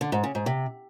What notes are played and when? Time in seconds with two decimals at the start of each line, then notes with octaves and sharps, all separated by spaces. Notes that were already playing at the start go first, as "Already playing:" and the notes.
0.01 D3
0.12 G#2
0.24 C#3
0.35 G#2
0.46 C3